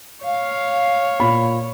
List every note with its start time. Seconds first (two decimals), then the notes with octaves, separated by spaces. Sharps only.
0.25 C#5 F5
1.20 A#2 B5